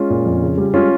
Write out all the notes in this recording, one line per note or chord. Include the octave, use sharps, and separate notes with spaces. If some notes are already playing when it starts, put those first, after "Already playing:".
Already playing: G#3 C#4 F4
A#2
F2
C#3
G3
G#3 C#4 F4